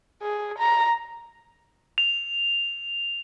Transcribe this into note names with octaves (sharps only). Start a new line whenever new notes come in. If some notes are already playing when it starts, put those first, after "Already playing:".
G#4
A#5
F7